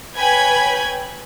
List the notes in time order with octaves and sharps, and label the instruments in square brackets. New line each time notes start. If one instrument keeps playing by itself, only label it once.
[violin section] B4 C#5 G5 G#5 B5 G#6